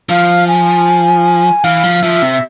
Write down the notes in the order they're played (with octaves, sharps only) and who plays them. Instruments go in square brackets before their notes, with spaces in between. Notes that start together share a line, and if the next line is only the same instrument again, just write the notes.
[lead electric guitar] F3 [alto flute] F5
[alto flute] G#5
[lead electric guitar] E3 [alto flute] F5
[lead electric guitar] F3
[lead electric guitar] F3 [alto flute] E5
[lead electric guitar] C3